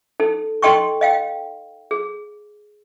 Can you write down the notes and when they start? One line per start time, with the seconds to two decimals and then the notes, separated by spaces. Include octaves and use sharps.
0.20 D#4 A4
0.62 D#4 A4 D#5 G5 C6 C#6
1.01 D#5 F5 G5
1.91 G#4